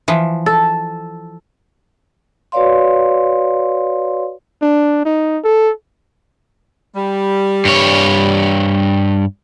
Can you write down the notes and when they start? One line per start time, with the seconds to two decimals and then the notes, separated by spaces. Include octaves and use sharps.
0.08 E3 F3
0.46 A4
2.52 F#4 B4 C#5 D5 F5 C6
4.62 D4
5.05 D#4
5.44 A4
6.95 G3
7.65 G2 C#5